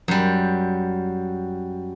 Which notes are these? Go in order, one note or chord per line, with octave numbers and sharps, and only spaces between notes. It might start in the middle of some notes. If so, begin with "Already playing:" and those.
F#2 G3